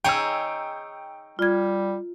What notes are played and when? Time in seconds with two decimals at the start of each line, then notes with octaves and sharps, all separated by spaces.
0.04 D#4 G#4 C#5 G5 E6
1.39 G3 F4 G#6